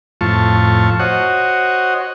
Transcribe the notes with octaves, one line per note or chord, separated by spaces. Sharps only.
F2 A2 F4 A5 C#6
F#4 C5 C#5 D#5 F#5